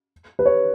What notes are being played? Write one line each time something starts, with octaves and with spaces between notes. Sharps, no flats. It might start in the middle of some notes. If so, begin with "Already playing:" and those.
B4
C#5